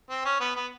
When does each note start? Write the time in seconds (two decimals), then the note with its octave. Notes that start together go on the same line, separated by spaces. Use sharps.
0.10 C4
0.25 C#4
0.40 B3
0.56 B3